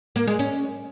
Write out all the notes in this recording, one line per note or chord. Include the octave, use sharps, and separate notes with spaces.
A#3
G#3
C#4